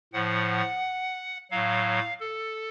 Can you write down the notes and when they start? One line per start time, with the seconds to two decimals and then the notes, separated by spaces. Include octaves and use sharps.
0.13 A2 F3 F#5
1.51 A2 F#3 F5
2.20 A4